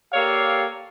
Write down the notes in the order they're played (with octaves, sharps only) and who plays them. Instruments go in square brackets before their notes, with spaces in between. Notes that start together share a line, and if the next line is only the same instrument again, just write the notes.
[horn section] A#3 G4 A4 C#5 D5 F5